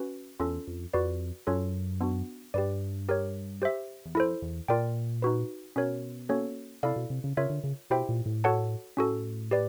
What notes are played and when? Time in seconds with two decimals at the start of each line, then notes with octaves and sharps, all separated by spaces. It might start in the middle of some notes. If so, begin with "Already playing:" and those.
Already playing: C#4 F#4 B4
0.40 E2 C#4 F4 A4
0.68 F2
0.94 F2 F#4 B4 D5
1.47 F#2 C#4 F4 A4 C#5
2.01 B3 D4 F#4
2.54 G2 G4 B4 D5
3.09 G4 A#4 C#5
3.62 G4 C5 E5
4.06 E2
4.15 F2 E4 A4 C5
4.42 E2
4.68 A#2 F4 A#4 D5 G5
5.22 D#4 F#4 B4
5.76 B2 C#4 F#4 A#4 C#5
6.29 A#3 C#4 F#4 A4 C#5
6.83 C3 E4 A4 D5 F5
6.96 B2
7.10 C3
7.24 C#3
7.37 C#3 F4 A#4 C#5 E5
7.50 D3
7.64 C#3
7.90 B2 E4 G4 C5 E5 G5
8.09 A#2
8.26 A2
8.44 F#4 A4 C#5 F#5 A5
8.97 A2 C#4 F#4 A4
9.51 G4 B4 D5